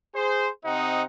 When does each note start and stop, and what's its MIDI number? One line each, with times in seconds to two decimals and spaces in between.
0.15 0.49 68
0.15 0.49 72
0.65 1.03 48
0.65 1.03 60
0.65 1.03 63
0.65 1.03 75
0.65 1.03 78